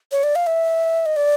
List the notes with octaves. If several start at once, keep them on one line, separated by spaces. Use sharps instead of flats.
C#5
D5
F5
E5
D#5
D5